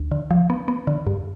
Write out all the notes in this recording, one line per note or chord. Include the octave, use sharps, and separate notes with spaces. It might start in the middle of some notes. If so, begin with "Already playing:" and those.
Already playing: D2
D3
F3
B3
B3
D3
G2